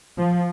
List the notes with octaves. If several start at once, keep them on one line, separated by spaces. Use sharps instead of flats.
F3